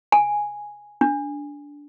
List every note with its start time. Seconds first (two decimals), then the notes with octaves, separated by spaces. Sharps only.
0.12 G#5
1.01 D4